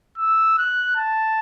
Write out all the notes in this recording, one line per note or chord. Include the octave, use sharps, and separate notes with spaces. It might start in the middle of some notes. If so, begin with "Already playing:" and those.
E6
F#6
A5